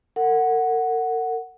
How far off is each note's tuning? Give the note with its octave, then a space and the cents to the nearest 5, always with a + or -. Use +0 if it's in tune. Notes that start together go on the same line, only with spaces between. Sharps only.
A#4 -45 F#5 +0